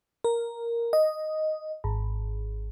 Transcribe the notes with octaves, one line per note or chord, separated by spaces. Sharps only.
A#4
D#5
G#1